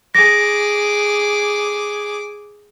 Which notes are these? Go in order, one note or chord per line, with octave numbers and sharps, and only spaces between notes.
G#4 D6 A#6